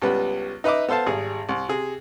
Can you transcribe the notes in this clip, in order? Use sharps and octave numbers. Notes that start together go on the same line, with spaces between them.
C#2 G3 B3 B4
D#4 B4 D#5 E5 D6
B3 A4 C5 F5 A5
G#1 G3 G#4
C2
C3 G#4